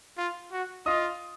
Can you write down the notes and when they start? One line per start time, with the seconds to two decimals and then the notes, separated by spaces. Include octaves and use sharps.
0.17 F4
0.52 F#4
0.86 F4 D#5 D#6